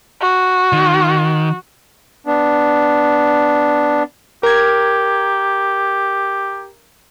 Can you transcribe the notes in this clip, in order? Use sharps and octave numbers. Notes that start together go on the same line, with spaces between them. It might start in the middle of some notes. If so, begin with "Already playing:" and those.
F#4
D#3
B3 D4
G4 A#4 G#6